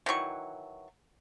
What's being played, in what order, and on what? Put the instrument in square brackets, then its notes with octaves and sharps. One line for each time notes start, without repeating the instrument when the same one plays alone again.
[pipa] D#3 E3 F#3 C#6